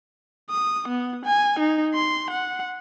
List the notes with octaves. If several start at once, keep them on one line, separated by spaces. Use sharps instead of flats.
D#6
B3
G#5
D#4
C6
F#5